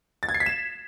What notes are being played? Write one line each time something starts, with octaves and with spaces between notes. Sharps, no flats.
A6
G#6
C7
B6
E7